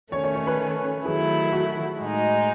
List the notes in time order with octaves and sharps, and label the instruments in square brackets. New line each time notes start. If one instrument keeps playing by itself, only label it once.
[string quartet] D#3 A3 C#4 [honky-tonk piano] C#5
[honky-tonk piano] C#5
C#5
B4
[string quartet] D#3 F#3 A3 E4 [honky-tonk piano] G#4
[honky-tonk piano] F#4
[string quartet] A2 G#3 D#4